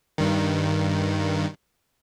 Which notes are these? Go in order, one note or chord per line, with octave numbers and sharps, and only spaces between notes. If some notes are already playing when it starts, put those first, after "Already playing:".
G2 D#3